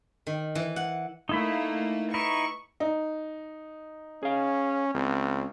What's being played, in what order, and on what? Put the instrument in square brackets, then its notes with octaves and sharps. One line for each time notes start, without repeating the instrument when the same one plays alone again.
[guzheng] D#3
E3
F#5
[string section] A3 A#3 [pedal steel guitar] D#4 E4 B5
[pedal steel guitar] D#4 E4 B4 [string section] C#6
[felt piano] D#4
[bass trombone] C#4 [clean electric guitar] G#4 F5
[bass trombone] C#2 [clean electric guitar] C4